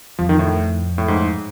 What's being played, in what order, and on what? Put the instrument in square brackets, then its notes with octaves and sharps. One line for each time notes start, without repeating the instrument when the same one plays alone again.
[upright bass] F2 [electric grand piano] F3
[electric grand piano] D#3
A2
A2
G#2